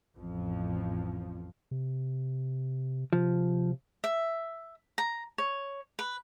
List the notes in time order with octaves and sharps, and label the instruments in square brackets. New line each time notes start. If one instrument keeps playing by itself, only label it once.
[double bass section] A1 F2 F3
[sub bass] C3
[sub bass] C3 [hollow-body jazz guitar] F3
[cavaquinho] E5
A#5
C#5
B4